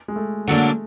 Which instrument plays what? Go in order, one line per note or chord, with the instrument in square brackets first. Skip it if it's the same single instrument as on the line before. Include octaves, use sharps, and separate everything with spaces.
[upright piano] G#3
A3
[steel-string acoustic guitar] D3 F#3 A#3 D4 [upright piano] A3